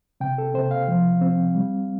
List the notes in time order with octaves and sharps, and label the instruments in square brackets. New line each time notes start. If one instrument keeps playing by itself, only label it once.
[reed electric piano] C3 G5
A4
C3 C5
F5
F3
C4
G3